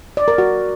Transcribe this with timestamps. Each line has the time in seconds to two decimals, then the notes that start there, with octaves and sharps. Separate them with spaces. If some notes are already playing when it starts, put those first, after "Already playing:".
0.17 D5
0.28 A#4
0.38 F#4